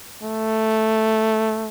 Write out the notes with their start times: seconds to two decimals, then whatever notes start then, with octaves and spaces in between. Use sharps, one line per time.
0.23 A3